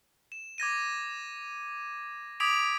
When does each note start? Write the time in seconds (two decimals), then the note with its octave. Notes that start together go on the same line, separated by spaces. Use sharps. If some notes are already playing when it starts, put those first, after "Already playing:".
0.32 E7
0.58 D6 G#6 A#6 D#7
2.40 D6 D#6 G#6 B6 D7 F7